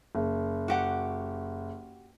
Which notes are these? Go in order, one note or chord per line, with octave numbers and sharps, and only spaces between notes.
F#1
F#4 G4 F#5